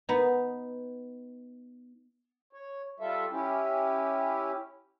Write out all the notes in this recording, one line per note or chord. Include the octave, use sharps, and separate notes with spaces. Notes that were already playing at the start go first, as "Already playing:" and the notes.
B3 D#4
C#5
G3 F4 A4 E5
C#4 E4 G4